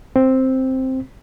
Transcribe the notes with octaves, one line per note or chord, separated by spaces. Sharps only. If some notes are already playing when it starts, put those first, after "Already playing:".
C4